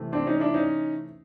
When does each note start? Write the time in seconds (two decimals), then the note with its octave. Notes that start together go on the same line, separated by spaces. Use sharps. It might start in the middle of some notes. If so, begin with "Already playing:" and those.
Already playing: C3 E3 A3
0.12 C4 D4
0.26 C#4 D#4
0.40 D4 E4
0.54 C#4 D#4